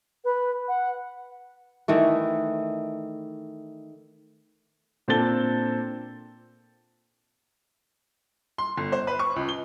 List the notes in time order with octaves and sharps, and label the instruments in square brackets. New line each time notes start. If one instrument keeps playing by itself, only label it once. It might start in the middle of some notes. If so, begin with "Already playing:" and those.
[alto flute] B4
F#5
[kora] D#3 E3 A3
[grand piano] A#2 C4 D4 A4 A6 G7
[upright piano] C6
G1
C5
B4
C#6
C#2
G7